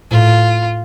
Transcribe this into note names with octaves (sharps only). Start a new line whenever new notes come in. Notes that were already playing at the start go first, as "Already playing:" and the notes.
A2 F4